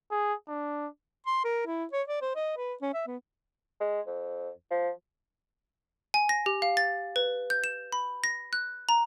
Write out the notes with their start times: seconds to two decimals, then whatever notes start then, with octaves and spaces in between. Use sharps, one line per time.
0.11 G#4
0.48 D4
1.27 C6
1.45 A#4
1.66 E4
1.93 C#5
2.08 D5
2.22 C5
2.36 D#5
2.57 B4
2.81 C#4
2.94 E5
3.07 B3
3.80 G#3
4.07 F2
4.71 F3
6.14 G#5
6.29 A#6
6.46 G4
6.62 F5
6.77 A6
7.16 B4
7.50 G6
7.64 E7
7.92 B5
8.24 A#6
8.53 F#6
8.89 A#5